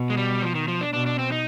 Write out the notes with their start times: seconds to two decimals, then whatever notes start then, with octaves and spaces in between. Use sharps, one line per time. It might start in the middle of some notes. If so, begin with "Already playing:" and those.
Already playing: B2
0.10 G#3
0.17 G3
0.42 F3
0.55 D#3
0.68 F3
0.81 D4
0.93 B2 D4
1.06 D4
1.19 C4
1.32 D#4